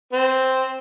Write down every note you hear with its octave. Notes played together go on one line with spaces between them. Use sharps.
C4